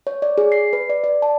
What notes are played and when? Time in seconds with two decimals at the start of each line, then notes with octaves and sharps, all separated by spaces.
0.07 C#5
0.22 D5
0.38 G#4
0.52 C7
0.73 B4
0.90 D5
1.04 D5
1.22 A5